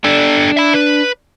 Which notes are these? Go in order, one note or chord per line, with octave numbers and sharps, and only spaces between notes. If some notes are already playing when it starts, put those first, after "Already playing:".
G3 D4 A4
E5 B5
B4